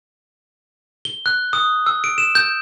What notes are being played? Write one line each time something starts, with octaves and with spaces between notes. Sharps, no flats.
G7
F#6
D#6
E6
D7
E7
G6